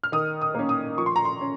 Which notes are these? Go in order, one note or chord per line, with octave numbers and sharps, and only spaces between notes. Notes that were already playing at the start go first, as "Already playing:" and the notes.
F6
D#3 D#6
D#6
A#3 C#4
D#6
F3 C#6
C6
A#5
C6
C#4